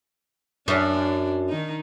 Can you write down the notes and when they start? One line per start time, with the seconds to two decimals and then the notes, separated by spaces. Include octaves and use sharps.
0.68 F#2 D4
1.49 D#3 D#4